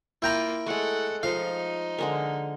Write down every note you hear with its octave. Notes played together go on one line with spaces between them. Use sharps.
A#3 E4 F4 G5 A#5
G#3 A3 A4 F#5
F3 D#4 C5 F5
D3 G#3 A#4